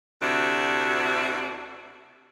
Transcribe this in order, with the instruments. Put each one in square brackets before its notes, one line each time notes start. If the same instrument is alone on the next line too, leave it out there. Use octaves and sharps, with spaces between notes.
[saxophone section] D2 C3 D4 E4 F#4 E5